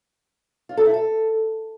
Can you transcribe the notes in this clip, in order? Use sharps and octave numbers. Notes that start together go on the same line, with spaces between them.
F4
A4
E4
A4